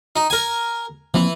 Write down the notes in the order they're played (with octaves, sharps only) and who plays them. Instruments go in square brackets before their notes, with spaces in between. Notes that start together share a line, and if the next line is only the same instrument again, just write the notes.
[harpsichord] D#4
A#4 G#5
[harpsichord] E3 [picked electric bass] F3 A#3 C4